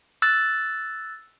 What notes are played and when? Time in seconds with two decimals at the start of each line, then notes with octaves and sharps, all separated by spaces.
0.22 E6 F#6 A6